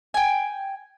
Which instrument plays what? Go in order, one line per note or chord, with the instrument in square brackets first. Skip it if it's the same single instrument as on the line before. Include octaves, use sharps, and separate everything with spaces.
[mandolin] G5 G#5